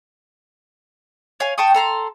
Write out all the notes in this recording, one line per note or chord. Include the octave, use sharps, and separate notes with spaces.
C#5 F5 G#5
G5 A5 C#6 D#6
A4 A#5 C6